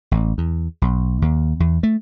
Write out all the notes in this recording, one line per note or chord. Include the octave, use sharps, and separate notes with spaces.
A1
E2
B1
D#2
E2
A3